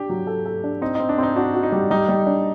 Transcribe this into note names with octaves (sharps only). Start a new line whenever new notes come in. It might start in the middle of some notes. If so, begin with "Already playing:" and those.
Already playing: D4 G4
F#3
A4
A4
D4
C4 D#4
C4 D#4
D4
C4 D#4
D4 F#4
F#4
D#4
G3
G3 D#4
G3
D4